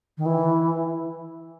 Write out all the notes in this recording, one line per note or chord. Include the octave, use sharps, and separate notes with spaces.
D#3
E3